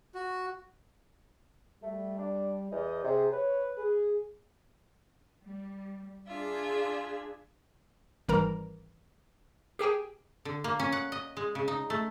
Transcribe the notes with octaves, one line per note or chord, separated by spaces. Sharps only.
F#4
G3 A3
D4
E2 D#5
C3 G#4
B4 C#5
G#4
G3
D4 F4 G#4 E5
G#1 G#2 E3 G3 A#4 A#5
G4 G#4 G5 G#5
D3
A#3
C#4
F#5
D#5
G#3
C#3
D#4
A3